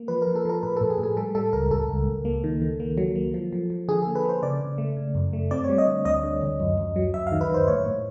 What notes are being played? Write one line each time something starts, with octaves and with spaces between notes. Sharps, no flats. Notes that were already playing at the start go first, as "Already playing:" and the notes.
Already playing: A#3
F3 B4
F3 A#4
A4
F3 A#4
A2 B4
A2 A4
G#4
A2
G#4
G3 A4
G3 A4
C#2 A#4
C#2 A4
C#2
C#2
A#3
D#3
D#3
A#3
F#3
A#3
F3
F3
F3
D3 G#4
A#3 A4
B4
A#3 C5
C#3 D5
C#3
A3
C#3
F#2
A3
C4 D5
G3 C#5
D#5
D3
D2 D#5
D3
D2
F#2
F#2
F#3
F#2 E5
D#3 F5
B4
D#3 C5
A2 C#5
A2